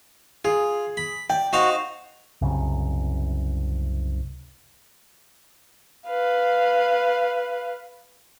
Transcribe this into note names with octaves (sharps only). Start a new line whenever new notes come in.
F4 G#4
B5
D5 G5
D#4 F#4 C5 F5
C2 F#2 C#3
B4 F5